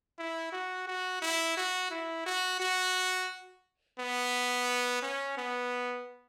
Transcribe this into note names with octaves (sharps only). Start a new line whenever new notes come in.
E4
F#4
F#4
E4
F#4
E4
F#4
F#4
B3
C#4
B3